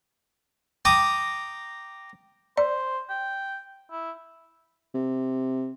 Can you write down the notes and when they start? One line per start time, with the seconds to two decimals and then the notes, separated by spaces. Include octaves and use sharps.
0.85 G5 A#5 D6 D#6
2.57 C5 D5
3.10 G5
3.91 E4
4.94 C3